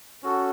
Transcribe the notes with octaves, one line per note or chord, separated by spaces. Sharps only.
C#4 F#4 A4